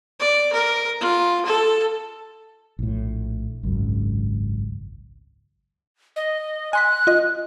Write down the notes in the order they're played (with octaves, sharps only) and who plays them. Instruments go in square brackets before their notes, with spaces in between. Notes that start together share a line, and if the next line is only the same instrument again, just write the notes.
[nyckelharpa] D5
A#4
F4
A4
[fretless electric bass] A#1 A2
G#1 C#2 F#2
[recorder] D#5
[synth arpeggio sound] G#5 C6 B6 [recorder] F#6
[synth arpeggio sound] F4 D#5